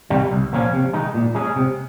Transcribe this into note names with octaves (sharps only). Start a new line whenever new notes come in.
C3 D#3 G3
C2
A#2 F3 A#3 C#4
C3
D#3 G#3 D#4
A#2
G#3 C#4 G#4
C3